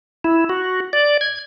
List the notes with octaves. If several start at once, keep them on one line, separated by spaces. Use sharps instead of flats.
E4
F#4
D5
G#6